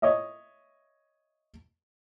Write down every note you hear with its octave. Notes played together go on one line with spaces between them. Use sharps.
C#5 D#5 E5